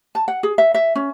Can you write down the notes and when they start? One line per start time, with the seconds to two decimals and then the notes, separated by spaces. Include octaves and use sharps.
0.15 A5
0.28 F#5
0.43 G#4
0.58 E5
0.74 E5
0.95 C#4